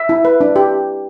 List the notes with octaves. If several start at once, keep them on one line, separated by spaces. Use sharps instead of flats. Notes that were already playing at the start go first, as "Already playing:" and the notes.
Already playing: E5
E4
B4
D4
G4